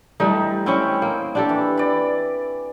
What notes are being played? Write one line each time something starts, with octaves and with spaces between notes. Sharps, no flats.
E3 G3 A3 D#4
C4 C#4 E4 G5 C#6
A#3 C4
D4 G4 A4
E3
D5 B5